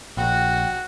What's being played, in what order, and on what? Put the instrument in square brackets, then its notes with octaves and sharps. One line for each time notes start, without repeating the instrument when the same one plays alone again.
[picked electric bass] A#1 [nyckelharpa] F#4 [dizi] G5